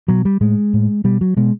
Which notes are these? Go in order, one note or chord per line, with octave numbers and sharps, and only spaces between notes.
B2 F#3
G3
A2 G#3
A2
B2 G3
F#3
B2 G#3